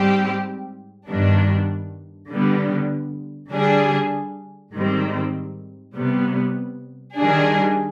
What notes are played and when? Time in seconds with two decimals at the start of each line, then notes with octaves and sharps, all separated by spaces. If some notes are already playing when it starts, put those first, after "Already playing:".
Already playing: G#2 G3 C4 G4
1.08 G2 D#3 G3 B3 D4
2.29 D3 G3 B3
3.51 D3 G3 D4 G#4
4.72 G#2 D#3 G3 C4
5.94 C3 G3 B3
7.16 D#3 G3 D4 G#4